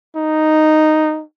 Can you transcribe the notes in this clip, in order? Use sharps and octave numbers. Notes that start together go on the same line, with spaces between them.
D#4